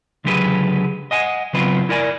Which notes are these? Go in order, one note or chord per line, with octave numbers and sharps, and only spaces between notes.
C#2 D3 F#3 G4 G#4 B4
D#5 F#5 G#5
C#3 F#3 B3 C4 F4 B4
E4 A#4 D5 G#5